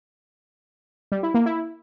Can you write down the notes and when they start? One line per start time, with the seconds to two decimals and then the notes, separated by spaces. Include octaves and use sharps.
1.12 G3
1.23 E4
1.34 A#3
1.46 E4